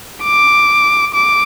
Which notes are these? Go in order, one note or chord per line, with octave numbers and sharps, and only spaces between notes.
D6
D6